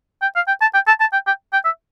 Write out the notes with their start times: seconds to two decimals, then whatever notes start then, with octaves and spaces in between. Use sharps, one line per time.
0.22 G5
0.36 F5
0.48 G5
0.61 A5
0.74 G5
0.88 A5
1.01 A5
1.13 G5
1.27 G5
1.53 G5
1.65 E5